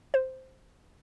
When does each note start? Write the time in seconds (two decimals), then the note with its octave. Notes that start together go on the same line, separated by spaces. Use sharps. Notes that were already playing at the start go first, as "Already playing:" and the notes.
0.14 C5